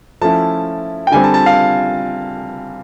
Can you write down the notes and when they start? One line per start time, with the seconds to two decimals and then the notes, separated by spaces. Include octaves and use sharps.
0.21 F3 A3 C#4 E4 A5
1.07 G5
1.12 D3 G3 C4 G#5
1.24 A5
1.34 A5
1.46 F5